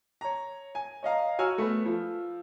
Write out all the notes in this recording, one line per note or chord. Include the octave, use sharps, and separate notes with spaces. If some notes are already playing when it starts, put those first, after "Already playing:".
C#5 A#5
G#5
C#5 D#5 F5 A#5
F#4 C#5 G#5 A#5 E6 F6
A3 B3
F3